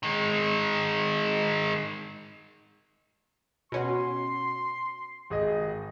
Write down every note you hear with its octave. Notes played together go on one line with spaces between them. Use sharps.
D#3 G#3
B2 C#4 F#4 C6
G#1 G#4 D#5